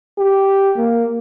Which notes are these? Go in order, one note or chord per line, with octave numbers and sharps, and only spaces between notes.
G4
A#3